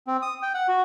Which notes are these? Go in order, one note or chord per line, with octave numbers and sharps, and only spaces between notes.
C4
D#6
G5
F#5
F#4